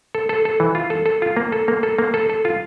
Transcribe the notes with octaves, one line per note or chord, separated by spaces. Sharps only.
A4
A4
A4
E3
F4
A4
A4
F4
A#3
A4
A#3
A4
A#3
A4
A4
F4